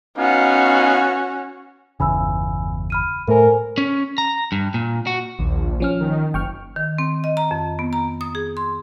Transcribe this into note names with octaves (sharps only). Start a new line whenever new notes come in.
B3 C#4 D#4 F#4 F5
G1 E2 C#3 G#5 B5 E6
B5 F6 D#7
A2 A3 A4 A#4 C5 G#5
C#4
A#5
G2
A#2
F#4
A#1 D#2
F3 C#4 F6
D#3
F#1 G5 C#6 F6
D#3
C4
D#5
A#5
F2
B3
A#5
D#6
G#4
C6